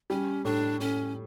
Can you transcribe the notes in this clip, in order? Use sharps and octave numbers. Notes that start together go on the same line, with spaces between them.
G3 C#4
A2 D4
A2 C#4